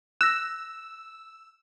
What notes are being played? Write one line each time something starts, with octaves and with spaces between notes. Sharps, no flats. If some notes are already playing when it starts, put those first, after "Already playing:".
E6 F#6 A#6